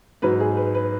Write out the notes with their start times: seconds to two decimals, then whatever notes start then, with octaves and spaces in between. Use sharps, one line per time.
0.22 G#2 F#3 B4
0.40 G#4
0.57 B4
0.75 B4